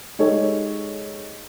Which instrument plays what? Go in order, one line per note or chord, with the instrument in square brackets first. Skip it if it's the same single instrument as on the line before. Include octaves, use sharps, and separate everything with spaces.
[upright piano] G#3 D#4 G4 A4 C#5 D#5